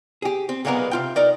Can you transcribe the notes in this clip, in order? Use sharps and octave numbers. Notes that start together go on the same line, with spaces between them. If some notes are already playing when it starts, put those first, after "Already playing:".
G4 G#4
C4
B1 A#2 G#3 A#3 B3 A#4
C3 F4 G5
D#4 A#4 D5